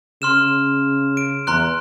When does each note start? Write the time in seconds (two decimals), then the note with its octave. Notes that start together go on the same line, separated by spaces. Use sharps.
0.22 C#3 C6 F6 E7
1.17 D7
1.47 E2 A#5 C6 F#6